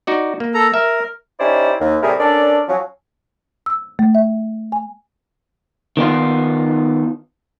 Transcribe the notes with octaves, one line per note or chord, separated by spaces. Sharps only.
D#4 F#4 D5
A#3
A4 A#5
A#4 E5
C#4 D#4 E4 G4 C5 D5
D#2
A2 C3 G3 E4 G#4 A#4
C#4 D4 A4 A#4 D5
F3 F#3 C#4
E6
A3
E5
G#5
D#3 B3 D#4 F4